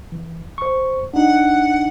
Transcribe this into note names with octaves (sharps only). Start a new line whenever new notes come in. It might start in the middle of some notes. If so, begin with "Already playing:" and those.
E3
C5 C#6
D4 D#4 F#5